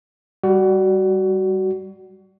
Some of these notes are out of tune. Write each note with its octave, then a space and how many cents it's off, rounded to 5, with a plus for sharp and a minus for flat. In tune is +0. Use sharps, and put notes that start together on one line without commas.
G3 +0 F#4 +25